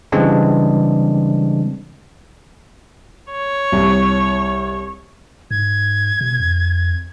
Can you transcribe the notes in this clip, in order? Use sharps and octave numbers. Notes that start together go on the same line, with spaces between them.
C#3 E3 G3 G#3 C4 D4
C#5
C2
G#2 G#6
B2
F2